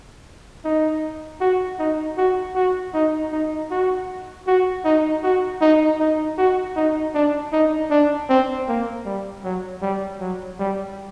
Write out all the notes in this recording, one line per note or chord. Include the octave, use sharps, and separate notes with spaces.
D#4
F#4
D#4
F#4
F#4
D#4
D#4
F#4
F#4
D#4
F#4
D#4
D#4
F#4
D#4
D4
D#4
D4
C4
A#3
G3
F#3
G3
F#3
G3